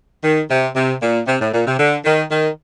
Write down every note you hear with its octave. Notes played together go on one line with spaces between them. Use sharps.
D#3
C3
C3
A#2
C3
A2
A#2
C3
D3
D#3
D#3